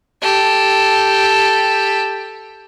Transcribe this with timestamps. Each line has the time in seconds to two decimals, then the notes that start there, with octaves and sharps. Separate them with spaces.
0.22 G4 A4